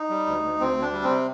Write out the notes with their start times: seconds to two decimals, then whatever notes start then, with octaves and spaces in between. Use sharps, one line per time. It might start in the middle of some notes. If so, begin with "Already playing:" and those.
Already playing: D#4
0.10 G3
0.27 D2
0.43 D2
0.60 D2 C4
0.77 D2
0.82 D4
0.93 G3
1.04 C4
1.09 C3